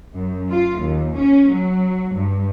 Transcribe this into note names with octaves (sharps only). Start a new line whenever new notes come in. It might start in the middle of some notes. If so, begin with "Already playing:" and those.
F#2
F4
D#2
C#4
F#3
G2